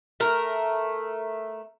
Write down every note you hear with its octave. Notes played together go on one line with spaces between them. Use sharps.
A3 A#4